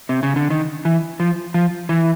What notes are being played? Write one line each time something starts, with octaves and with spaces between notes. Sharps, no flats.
C3
C#3
D3
D#3
E3
F3
F3
E3